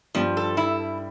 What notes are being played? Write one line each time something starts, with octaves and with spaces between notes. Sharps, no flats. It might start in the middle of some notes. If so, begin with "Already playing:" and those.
G2 F3 G3
A4
E4